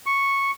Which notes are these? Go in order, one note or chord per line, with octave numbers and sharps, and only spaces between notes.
C#6